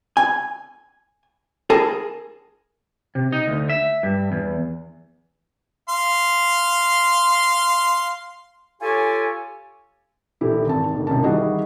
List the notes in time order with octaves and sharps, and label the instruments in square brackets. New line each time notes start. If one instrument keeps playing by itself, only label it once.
[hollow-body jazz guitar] G#5
G#4 A#4 G#5 A5
[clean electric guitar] C3
D#4
D2
E5
G2
E2
[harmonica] F5 C6
[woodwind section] F4 G4 A4 C#5 G#5
[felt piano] A#1 D#3 E3 E4 G4 A4
G#1 A5
D#2 G#2 D3
C2 G#2 C#4 A5
D#3 E3 G3 F#4 G#4 D#5